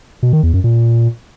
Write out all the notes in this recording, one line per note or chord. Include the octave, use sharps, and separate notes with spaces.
B2
D#3
E2
F#2
A#2